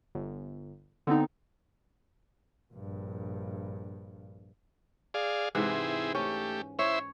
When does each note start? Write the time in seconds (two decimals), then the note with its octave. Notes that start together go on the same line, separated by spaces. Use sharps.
0.15 G1
1.07 D3 B3 C4 D#4
2.74 A#1 G2
5.14 G#4 D5 F5
5.55 G#2 C3 E3 C4 E4 G#4
6.15 A3 C#4 G4
6.79 E4 C5 C#5 E5